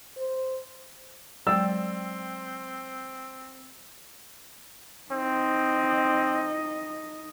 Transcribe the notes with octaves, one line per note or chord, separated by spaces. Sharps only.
C5
F#3 G#3 C4 D5 G5 E6
C4 D#4 D#5